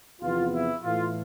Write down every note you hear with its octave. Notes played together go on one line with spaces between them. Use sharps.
E2 C3 F3 B3 F4
E4
A2 E3 A3 F4